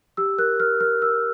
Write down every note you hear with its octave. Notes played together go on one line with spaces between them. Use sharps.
G4 E6
A#4 F#6
A#4 F6
A#4 F6
A#4 E6